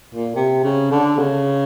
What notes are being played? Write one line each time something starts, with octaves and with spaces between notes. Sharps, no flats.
A#2
C3
C#3
D3
C#3